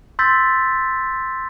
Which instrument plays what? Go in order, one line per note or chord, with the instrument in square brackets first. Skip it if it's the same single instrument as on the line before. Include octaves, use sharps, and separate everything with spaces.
[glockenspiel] C6 E6 G6 A6 B6